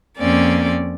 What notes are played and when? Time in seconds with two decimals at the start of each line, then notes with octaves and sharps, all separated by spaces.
0.18 F2 A#3 C4 C#4 D5